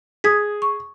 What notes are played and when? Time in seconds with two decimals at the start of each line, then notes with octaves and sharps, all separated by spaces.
0.24 G#4 D#6 G#6 B6
0.62 C#6